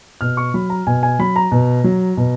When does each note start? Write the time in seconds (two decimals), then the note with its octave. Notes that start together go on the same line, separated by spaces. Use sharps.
0.21 B2 F6
0.37 C#6
0.54 F#3 B5
0.70 A#5
0.87 B2 G#5
1.03 G#5
1.19 F#3 B5
1.36 A#5
1.52 B2
1.84 F#3
2.17 B2